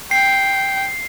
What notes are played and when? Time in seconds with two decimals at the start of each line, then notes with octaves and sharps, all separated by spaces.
0.11 G5 C7